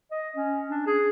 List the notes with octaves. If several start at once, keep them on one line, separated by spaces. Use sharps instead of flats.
D#5
C#4
D4
G#4